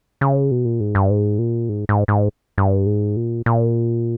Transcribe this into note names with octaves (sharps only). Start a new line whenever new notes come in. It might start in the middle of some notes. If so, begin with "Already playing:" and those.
C#3
B2
A#2
G#2
G2
G#2
A#2
G#2
G#2
G#2
G2
G#2
A#2
A#2